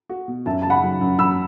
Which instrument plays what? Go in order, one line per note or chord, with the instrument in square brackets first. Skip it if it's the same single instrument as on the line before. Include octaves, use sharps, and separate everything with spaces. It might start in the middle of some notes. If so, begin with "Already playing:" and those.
[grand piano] F#4
B2
[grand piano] F#2 [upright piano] E5 A5
[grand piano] C#3 [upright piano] A5
[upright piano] F#5 B5
[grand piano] F#3
F#2
[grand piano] F#2 [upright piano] B5 E6